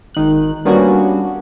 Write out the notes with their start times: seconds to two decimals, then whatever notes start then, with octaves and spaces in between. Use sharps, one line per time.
0.15 G#1 D#3 F#6
0.65 G3 A#3 B3 C#4 D4 F#4